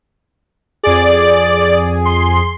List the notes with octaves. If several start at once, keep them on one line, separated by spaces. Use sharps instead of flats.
F2 G#4 D5
C6